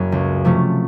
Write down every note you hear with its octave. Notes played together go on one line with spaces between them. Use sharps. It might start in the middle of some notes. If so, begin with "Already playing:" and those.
Already playing: F#1 F#2
C#2
C3 F3 A3 C#4